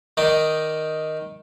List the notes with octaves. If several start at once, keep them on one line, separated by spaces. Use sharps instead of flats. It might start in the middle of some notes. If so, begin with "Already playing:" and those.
D#3 D#4 D5